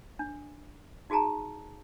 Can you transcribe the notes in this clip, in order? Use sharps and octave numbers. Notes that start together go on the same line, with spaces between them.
D4
D#4 F#4 G#4 A5 A#5